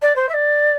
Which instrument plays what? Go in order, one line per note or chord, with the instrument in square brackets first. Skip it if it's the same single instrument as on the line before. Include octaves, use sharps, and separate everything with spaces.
[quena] D5
C5
E5
D5